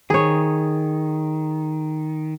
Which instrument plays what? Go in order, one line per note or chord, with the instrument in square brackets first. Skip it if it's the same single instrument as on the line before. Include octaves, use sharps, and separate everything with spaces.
[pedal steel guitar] D#3 [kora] G#4 C#5